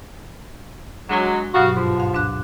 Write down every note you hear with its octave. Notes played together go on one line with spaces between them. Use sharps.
F#3 G#3 D4 F#4
G2 B2 F#3 F#4 F5
G#2 B2 F3
D2 F5
G#2 D4 F#6